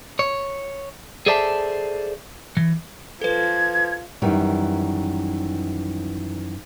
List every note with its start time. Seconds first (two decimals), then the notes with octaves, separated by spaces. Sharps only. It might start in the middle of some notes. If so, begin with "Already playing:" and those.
0.19 C#5
1.26 G#4 A4 C5 D5 E5 A5
2.57 E3
3.22 F3 A4 B4 G#6
4.22 F#2 D#3 E3 G3